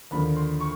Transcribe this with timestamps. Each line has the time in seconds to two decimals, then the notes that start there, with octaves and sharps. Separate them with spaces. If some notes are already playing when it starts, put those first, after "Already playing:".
0.11 D#2 D3 F3 B5
0.37 C6
0.60 C#6